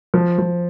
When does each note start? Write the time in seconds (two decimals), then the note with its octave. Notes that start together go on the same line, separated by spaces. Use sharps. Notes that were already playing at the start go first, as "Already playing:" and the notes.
0.14 F3
0.38 F3